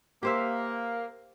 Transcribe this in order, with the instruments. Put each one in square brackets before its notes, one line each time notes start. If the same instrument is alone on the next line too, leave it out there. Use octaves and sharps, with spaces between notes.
[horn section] A#3 [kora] G4 C5 E5